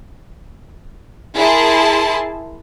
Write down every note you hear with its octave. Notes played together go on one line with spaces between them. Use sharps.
E4 G#4 A#4 A5 C6